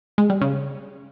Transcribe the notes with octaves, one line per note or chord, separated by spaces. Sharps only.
G#3
G3
C#3